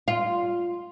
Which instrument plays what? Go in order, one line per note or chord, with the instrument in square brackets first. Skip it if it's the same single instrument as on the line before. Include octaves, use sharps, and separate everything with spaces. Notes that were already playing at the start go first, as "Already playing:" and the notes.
[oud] F4